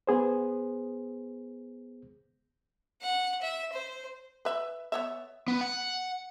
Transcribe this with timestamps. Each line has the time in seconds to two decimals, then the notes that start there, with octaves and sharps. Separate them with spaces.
0.07 B3 G#4 C5
3.02 F#5
3.42 E5
3.73 C5
4.45 B4 E5
4.92 B3 C#5 E5
5.48 B3
5.61 F#5